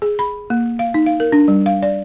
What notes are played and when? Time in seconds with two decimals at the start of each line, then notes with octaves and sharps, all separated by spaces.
0.02 G#4
0.19 B5
0.50 A#3
0.79 F5
0.94 D#4
1.06 F5
1.20 A#4
1.32 D4
1.48 G3
1.66 F5
1.82 D5